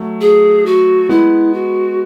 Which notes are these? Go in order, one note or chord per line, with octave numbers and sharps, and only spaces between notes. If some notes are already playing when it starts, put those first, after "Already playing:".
Already playing: F#3 A3
G#4
F#4
G#3 B3 E4
F#4